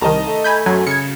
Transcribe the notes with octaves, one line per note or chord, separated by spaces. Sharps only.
C2 D#3 D#5 A5 A#5
A3
G#5 B5 G6
F#2 F#3 G#5
C#3 G#6 C#7